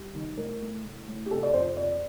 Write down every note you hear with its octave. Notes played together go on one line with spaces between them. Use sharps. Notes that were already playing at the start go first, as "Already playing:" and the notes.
Already playing: G3
D#3
A2 A#4
A3
A2
A2
G4
C3 A4
D5
F2 C5
F2 D5